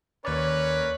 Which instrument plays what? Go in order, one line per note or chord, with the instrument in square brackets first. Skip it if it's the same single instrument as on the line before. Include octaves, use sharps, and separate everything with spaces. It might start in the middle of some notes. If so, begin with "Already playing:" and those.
[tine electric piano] D#2 D5 [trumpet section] C#4 A#4 B4 [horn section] C#5